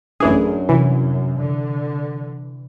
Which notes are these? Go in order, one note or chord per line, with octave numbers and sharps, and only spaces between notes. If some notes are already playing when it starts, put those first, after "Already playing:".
A1 F#2 E3 D4 G#4
C3 E3
D3